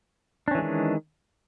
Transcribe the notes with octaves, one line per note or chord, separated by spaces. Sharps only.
D#3 E3 G#3 C#4 D4